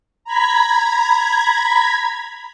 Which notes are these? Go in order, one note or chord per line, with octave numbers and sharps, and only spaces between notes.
A#5 B5 G#6 B6